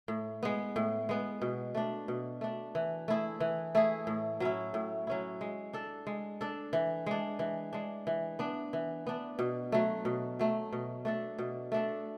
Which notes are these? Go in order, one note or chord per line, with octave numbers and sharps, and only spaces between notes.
A2
G#3 B3
A2
G#3 B3
B2
A3 D4
B2
A3 D4
E3
A3 E4 G#4
E3
A3 E4 G#4
A2
F#3 C#4 E4
A2
F#3 C#4 E4
G#3
D4 A4
G#3
D4 A4
E3
G#3 D4
E3
G#3 D4
E3
B3 D4
E3
B3 D4
B2
F#3 A3
B2
F#3 A3
B2
A3 D4 A4
B2
A3 D4 A4